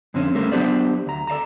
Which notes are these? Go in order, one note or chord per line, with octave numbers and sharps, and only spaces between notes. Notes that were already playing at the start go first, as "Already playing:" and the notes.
F2 D3 C4 C#4
G3 A3 C4 C#4 A4 A#4
F#3 B3 D4 G4 C5 D5
D2 A#5
A4 D5 F5 A5 A#5